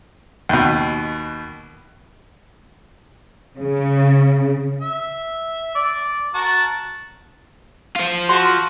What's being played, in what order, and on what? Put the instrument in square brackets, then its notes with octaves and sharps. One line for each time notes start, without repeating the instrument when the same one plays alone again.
[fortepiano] D#2 B2
[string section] C#3
[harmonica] E5
D5
F#4 A#4 A5
[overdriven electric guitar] F4 C5
[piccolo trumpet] F#4 [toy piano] C6